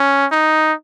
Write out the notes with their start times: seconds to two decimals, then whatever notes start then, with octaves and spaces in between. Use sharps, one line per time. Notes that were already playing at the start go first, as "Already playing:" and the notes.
Already playing: C#4
0.32 D#4